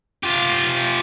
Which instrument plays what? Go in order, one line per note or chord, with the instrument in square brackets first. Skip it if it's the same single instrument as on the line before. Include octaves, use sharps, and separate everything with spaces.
[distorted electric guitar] F4 G4